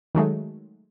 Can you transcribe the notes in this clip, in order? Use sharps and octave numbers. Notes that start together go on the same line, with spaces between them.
D#3 F#3 G#3 A3